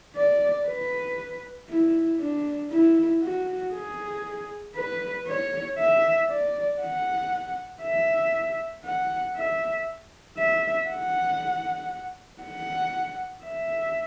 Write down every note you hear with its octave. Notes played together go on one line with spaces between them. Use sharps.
D5
B4
E4
D4
E4
F#4
G#4
B4
C#5
E5
D5
F#5
E5
F#5
E5
E5
F#5
F#5
E5